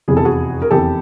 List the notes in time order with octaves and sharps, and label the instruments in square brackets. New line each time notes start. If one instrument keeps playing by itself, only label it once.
[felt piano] F1 E2 C3 G#4
A4
F#4 G#4
A#4
F1 E2 C3 G4 A4